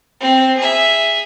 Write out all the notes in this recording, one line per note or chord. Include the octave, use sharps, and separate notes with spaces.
C4
G#4 E5